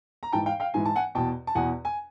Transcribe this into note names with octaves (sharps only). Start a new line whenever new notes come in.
A#5
G#2 E3 G5 A5
F5 G5
F5 G5
G#2 E3 G#5
A5
F#5 G#5
E2 B2 G5 A5
A5
E2 B2 F#5 G#5
G#5